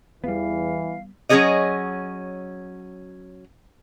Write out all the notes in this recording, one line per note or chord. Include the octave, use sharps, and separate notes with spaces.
E2 E3 G3 B3 F5
F#3 C#4 F#4 G#4 C#5 D#5